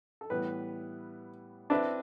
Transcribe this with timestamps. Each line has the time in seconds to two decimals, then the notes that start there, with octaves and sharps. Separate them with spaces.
0.21 A4
0.30 A2 E3 G3 B3 B4
1.70 C4 D4 E4 B4 E5